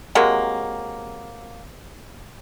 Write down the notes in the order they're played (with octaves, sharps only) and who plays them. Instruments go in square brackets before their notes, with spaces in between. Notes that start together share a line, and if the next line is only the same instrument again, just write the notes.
[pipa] C3 F#3 G#3 A#3